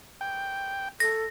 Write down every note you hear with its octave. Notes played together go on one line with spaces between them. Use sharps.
G5
A4 A#6